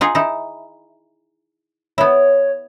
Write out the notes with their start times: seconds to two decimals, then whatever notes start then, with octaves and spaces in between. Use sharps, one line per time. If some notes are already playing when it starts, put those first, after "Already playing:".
0.01 D#4 F4 G#4
0.15 D#4 E4
1.98 B3 E4 C#5